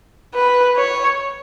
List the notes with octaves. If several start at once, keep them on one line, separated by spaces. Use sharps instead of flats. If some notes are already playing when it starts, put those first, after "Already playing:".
B4
C#5